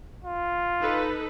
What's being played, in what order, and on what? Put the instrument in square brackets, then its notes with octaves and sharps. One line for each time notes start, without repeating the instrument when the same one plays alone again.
[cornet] F4
[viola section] D#4 A4 B4